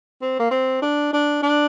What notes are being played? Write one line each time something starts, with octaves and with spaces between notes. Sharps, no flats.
C4
A#3
C4
D4
D4
D4